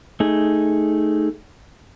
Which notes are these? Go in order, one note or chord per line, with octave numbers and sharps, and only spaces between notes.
A3 D#4 G#4